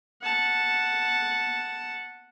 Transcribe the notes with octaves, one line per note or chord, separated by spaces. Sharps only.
F#5 A5